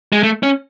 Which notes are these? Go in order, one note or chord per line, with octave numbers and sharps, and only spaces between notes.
G#3
A3
C#4